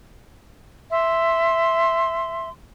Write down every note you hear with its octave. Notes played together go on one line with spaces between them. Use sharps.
E5 C6